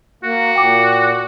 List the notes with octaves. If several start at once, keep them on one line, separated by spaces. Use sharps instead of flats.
A#3 F#4
A#2 G5 D6